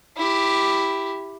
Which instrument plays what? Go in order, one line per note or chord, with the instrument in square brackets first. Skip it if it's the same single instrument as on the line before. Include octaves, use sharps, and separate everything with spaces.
[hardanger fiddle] E4 G4